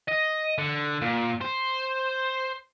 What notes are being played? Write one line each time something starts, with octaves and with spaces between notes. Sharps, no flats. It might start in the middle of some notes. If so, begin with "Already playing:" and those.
D#5
D3
A#2
C5